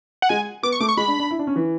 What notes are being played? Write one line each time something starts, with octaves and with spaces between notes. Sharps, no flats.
F#5
G#3 G#5
B3 D6
C#6
A3 D6
C#6
G#3 B5
D4
D4
E4
D4
C#4
E3